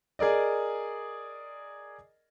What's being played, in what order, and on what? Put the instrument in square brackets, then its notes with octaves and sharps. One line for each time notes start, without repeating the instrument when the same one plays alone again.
[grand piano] G#4 A#4 D5 D#5